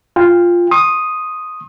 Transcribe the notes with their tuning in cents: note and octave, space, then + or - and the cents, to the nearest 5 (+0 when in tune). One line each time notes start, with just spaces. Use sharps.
F4 +0 G5 +35
C6 +40 D#6 +0